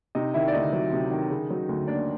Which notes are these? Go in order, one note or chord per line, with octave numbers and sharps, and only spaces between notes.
C3 D#4 D#5
D#3 E4 E5
D5
D2 D#4 D#5
F#3
C3
D#3
C#3
F#3
D2
A#3 D4 D5